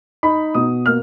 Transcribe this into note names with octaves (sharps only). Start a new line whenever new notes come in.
D#4 B5
B2 D#6
A#3 F6